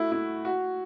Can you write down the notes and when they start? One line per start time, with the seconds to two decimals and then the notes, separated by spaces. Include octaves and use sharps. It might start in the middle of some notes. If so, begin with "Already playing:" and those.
Already playing: A3 E4 F#4
0.12 E4
0.45 F#4